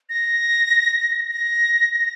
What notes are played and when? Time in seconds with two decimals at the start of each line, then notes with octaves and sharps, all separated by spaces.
0.09 A#6
1.32 A#6
1.93 A#6